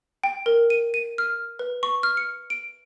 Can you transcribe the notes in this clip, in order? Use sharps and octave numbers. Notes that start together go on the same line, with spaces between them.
G5
A#4
D#7
D#7
F6
B4
C#6
F6
C#7
D7